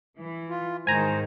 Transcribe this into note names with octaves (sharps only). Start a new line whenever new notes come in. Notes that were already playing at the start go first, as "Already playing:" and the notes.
E3
F4
G#2 D#3 C5 G#5 A#5